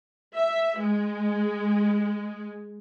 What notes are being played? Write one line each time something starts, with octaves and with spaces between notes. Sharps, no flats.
E5
G#3